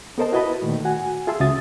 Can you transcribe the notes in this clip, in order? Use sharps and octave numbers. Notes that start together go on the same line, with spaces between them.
B3 A4 A#4 C5 D#5 A5
E4 F#4 B4 D#5 A5 B5
A#2 D#3 A3
F#4 F#5 G#5
F4 G#4 E5 A5 C6 E6
C#2 C#3 F#4 E5 D#6 A6